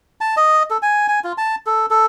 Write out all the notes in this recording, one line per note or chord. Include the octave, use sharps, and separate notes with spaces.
A5
D#5
A4
G#5
G#5
F4
A5
A4
A4